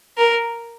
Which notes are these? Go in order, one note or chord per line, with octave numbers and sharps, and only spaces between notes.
A#4